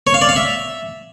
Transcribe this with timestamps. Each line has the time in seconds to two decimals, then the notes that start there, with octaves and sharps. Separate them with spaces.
0.07 C#5
0.14 F5
0.21 D5
0.29 F5
0.36 E5